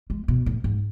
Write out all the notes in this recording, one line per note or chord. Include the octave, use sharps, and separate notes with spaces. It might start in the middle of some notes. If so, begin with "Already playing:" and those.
G#3
B2
A2
G#2